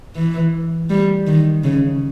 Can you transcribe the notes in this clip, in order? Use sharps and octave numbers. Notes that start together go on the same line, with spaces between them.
E3
G3
D#3
C#3